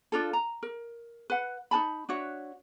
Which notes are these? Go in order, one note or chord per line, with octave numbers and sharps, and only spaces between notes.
D4 F4 A4
A#5
A#4
B4 F#5
D#4 B4 A5 B5
D4 F#4 C#5 E5